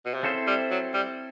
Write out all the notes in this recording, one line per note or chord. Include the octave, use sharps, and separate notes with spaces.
B2
C3
C#3 C4 E4 A4 C5
G3
F#3
G3